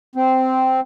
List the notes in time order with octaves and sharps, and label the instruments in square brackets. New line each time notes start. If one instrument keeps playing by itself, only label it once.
[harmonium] C4